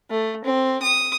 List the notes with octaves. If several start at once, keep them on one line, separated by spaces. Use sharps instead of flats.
A3
C4
D#6